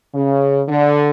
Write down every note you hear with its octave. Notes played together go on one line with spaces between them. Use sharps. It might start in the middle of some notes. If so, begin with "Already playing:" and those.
C#3
D3